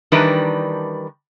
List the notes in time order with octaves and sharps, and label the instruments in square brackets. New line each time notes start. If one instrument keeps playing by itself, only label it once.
[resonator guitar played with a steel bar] D#3 E3 G3 D4 A#4 B4